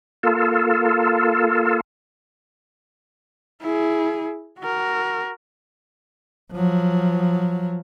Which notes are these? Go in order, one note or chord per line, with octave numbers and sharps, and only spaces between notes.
A#3 F4 A4
E4 G#4
F#4 A#4
F3 F#3